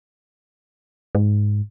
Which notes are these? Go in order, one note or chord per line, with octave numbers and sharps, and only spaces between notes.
G#2